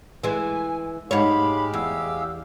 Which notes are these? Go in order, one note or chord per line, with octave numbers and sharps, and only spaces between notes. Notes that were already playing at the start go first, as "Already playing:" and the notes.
E3 G#3 G#5
G#2 G#3 G4 C#5 F5 B5
E2 E6